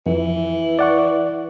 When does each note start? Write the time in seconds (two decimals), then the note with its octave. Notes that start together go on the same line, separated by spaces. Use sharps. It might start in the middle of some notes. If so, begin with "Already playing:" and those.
0.06 F2 E3
0.79 D5 F#5 C#6